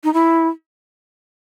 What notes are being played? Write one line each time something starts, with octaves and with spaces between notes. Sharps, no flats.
D#4
E4